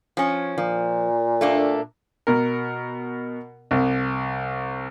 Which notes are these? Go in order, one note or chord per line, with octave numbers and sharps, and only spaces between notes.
F3 C#4
A#2 F3
A3 A#3 D4
B2 A#4
C2